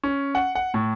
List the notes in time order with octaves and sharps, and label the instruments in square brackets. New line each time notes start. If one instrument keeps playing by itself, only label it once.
[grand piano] C#4
F#5
F#5
A2